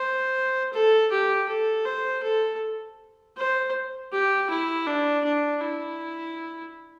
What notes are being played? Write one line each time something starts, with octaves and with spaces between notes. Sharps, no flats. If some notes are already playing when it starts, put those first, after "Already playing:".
Already playing: C5
A4
G4
A4
C5
A4
C5
G4
E4
D4
D4
E4